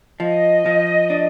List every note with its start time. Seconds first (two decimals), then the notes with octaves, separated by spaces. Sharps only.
0.20 F3 D#5
0.66 F3
1.10 D4